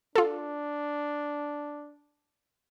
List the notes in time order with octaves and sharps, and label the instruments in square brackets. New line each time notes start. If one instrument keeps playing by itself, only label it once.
[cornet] D4 [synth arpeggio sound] F4 A4